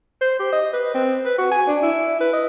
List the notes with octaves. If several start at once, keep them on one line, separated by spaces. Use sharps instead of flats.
C5
G4
D#5
B4
C4
B4
F#4
G#5
D4
E4
B4
D#5